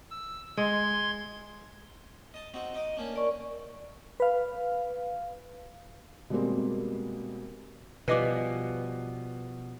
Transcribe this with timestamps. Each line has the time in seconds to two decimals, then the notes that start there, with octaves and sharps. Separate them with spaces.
0.11 E6
0.57 G#3 C6 G#6
2.34 D#5 A5
2.54 C4 D#4 F#4
2.74 D#4 D#5 D6
2.97 A#3 C#4 D4
3.14 A#4 D5 C#6
4.20 B4 F5
6.30 B2 G3 G#3 A#3 C4
8.08 B2 F3 G3 B4 D#5 G#5 D6